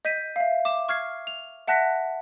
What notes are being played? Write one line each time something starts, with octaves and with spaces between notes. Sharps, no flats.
D#5 G6 B6 D#7
E5 F5
D6 E7
C#6 F6 G#6 C7
F7
E5 F#5 A5 F#6 A#6 B6